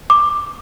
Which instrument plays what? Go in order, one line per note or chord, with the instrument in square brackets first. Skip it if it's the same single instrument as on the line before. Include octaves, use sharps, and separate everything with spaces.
[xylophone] D6